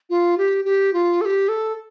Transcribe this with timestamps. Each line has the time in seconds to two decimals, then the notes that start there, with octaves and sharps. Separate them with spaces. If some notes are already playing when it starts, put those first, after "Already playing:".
0.10 F4
0.38 G4
0.65 G4
0.93 F4
1.21 A4
1.25 G4
1.49 A4